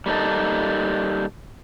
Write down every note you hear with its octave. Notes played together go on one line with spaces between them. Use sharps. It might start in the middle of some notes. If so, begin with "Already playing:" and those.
G3 A#3 D#4 A4